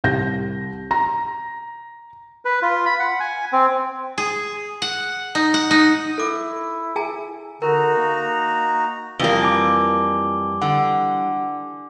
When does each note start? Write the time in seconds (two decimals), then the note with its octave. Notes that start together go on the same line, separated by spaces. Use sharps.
0.04 C2 G6 A#6
0.91 A#5 A#6
2.45 B4
2.62 F4
2.86 B5
2.99 F#5
3.20 G#5
3.53 C4
4.18 G#4
4.82 F#5
5.35 D#4
5.54 F#5
5.71 D#4
6.18 E4 A4 D6
6.96 G#4 G#5 A#5
7.62 D3 D#4 F#4 A#4 A#5
7.98 A#3
9.20 F2 E3 G3 A#3 G7
9.43 G#5 D6
10.62 D3 F#5